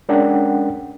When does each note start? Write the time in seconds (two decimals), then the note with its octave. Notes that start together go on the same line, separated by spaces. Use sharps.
0.09 G#3 C#4 D4 A#4 F#5 G5